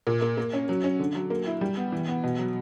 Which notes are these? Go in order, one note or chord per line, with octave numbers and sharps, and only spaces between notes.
A#2
A#3
A#3
C#4
F#3
C#4
D3
F#3
A#3
E4
G3
B3
E3
B3
B2
F#3